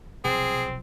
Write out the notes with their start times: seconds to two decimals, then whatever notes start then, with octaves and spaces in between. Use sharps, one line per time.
0.24 B1 C3 F3 C4 G#4